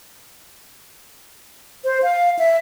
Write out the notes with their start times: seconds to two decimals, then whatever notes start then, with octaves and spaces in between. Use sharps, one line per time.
1.85 C5
2.03 F5
2.39 E5